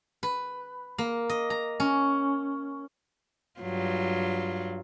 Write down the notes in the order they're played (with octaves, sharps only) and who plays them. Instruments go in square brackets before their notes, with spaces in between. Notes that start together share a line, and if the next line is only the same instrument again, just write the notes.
[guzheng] B4
A#3
D#5
A#5
C#4
[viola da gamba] G2 F#3 F4